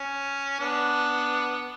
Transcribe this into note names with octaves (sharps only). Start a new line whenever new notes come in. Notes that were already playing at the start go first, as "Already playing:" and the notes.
Already playing: C#4
B3 D4